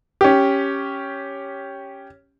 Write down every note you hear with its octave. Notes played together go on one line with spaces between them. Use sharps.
C#4 G4